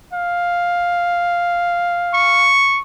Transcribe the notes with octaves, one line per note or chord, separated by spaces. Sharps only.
F5
C#6